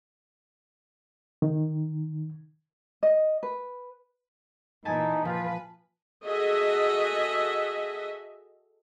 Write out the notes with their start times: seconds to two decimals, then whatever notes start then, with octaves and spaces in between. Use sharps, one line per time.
1.42 D#3
3.03 D#5
3.43 B4
4.85 A#2 E3 D#4 E4 G#5 A5
5.25 F3 F4 B4
6.24 F#4 G#4 A4 D#5 E5